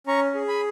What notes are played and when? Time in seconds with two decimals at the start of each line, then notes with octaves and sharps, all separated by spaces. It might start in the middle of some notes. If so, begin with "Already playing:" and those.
0.07 C#4 A#5 C#6
0.35 G#4
0.48 G#5 B5